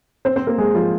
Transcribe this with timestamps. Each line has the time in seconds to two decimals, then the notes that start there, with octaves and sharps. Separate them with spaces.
0.25 C4 C5
0.36 C4 C5
0.47 A#3 A#4
0.58 G#3 G#4
0.75 F3 F4